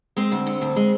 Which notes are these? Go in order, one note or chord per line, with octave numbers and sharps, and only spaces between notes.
G#3 C4 C5
D2
D3
D2
G#3